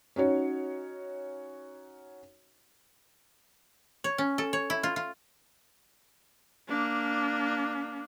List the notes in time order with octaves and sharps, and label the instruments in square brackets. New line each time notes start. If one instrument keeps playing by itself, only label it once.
[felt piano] C#4 D#4 F#4 C#5
[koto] C#5
C#4
A4
C#5
E4
F4
F4
[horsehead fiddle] A#3 D4